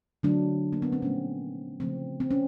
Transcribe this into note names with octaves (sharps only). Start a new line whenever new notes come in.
D3 F#3 A3 D4
A#3
B3
C4
A#2 F3 A3 C#4
C#3 F3 A3 C4
C4
C#4